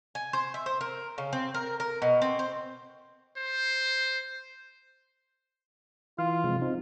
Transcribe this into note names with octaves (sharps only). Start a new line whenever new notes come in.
G#5
C5
E5
C5
A#4
C#3
C4
A#4
A#4
B2
C4
C5
C5
E3 F4 F5
C3 F3 G#3
C4 D#4 F4